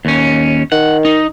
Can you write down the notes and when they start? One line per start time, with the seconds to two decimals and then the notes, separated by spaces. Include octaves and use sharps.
0.05 D#2 C#4
0.72 D#3 F#5
1.05 D#4